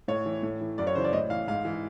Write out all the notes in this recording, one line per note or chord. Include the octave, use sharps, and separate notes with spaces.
A2 C#5
E3
A2
E3
F#2 D5
C#5
C#3 E3 C5
D5
A2 D#5
E3 F5
G#2 F5
E3